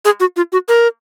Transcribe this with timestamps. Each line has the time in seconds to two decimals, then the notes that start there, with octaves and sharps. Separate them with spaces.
0.05 G#4
0.20 F#4
0.37 F4
0.52 F#4
0.68 A#4